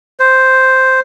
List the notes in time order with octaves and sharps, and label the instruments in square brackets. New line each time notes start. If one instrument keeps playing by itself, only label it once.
[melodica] C5